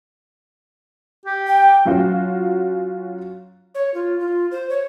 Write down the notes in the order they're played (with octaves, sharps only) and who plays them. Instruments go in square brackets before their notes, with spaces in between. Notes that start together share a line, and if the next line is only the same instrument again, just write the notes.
[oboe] G4
[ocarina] G5
[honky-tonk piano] F#3 C#4 F4 F#4
[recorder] C#5
F4
F4
C5
C#5